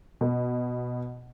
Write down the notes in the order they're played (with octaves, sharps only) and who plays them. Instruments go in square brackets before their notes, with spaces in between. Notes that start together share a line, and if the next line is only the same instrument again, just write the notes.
[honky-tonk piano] B2